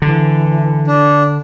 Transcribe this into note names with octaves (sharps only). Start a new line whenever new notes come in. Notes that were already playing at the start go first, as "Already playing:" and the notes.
D3 E3
D4